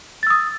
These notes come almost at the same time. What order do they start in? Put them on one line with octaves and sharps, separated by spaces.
A6 E6 D#6